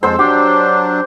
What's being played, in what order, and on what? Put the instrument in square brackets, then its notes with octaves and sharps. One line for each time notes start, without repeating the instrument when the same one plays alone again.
[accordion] F2 G#3 A4 [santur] C5 E6
[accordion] F#3 D4 [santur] G4